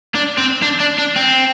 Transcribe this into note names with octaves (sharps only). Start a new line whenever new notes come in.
D4
C4
D4
D4
D4
C4